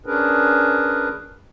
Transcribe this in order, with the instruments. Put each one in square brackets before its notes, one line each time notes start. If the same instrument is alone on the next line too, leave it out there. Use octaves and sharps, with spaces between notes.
[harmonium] C#4 D4 G#4 A#4 B4